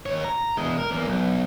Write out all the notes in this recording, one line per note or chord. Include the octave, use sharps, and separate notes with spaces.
D#2 C#5
A#5
E2 G#3
A#4
E2 A#3
B1